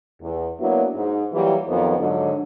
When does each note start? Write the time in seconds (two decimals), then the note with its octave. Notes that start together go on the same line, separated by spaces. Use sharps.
0.22 E2
0.60 F#3 A#3 B3 D4 E4 F#4
0.95 G#2
1.33 E3 F#3 G3 A#3 E4
1.68 F2 D#3 F3 F#3 B3 C5
1.99 G#2 D3 F#3